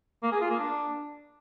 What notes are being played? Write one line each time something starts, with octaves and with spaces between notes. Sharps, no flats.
A#3
G#4
F4
A#3
D4